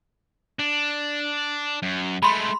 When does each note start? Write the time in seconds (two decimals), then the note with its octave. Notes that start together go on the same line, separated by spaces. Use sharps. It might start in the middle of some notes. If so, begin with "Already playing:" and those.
0.59 D4
1.82 F#2
2.23 G#3 A3 B5 C6